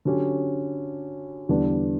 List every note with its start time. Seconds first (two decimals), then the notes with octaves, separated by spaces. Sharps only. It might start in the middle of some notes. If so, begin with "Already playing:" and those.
0.05 D3 F#3 C#4 G4
1.49 E2 D3 G3 B3 D4